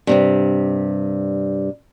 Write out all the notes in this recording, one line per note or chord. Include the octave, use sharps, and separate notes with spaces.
G2 C3 G3